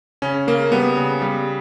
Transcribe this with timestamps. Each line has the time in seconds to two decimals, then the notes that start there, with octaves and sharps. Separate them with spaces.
0.22 C#3 C#4
0.47 C#3 A#3
0.72 G3 B3
0.97 C#3
1.22 G3